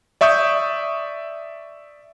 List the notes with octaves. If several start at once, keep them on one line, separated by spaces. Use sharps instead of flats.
D5 E5 C#6 D#6 G6